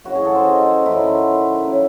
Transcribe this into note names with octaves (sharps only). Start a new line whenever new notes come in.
F#2 C#3 E3 F#4
G#4
A4
C5
D#5
C5
F#2 D#3 F#3 E4
C#3 F#3